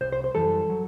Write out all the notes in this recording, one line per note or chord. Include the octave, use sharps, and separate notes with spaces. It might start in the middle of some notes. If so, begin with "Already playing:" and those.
C2 C3 C5
C5
C5
F#2 E3 G3 A4
F#3